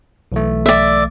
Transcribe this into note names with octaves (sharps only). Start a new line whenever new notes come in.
B1 E3 A3
D5 E5